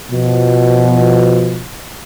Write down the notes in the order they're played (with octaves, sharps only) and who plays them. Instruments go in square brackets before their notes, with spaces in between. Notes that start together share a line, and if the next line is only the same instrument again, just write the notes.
[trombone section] B2 F3